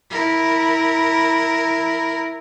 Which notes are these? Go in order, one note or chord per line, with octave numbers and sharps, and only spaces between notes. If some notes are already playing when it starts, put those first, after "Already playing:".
E4 A#4